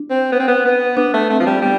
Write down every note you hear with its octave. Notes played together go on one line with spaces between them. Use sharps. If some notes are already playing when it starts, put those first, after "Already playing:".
Already playing: D4
C4
B3
C4
B3
B3
B3 D4
A3
A3 C4
F3
G3
G3 B3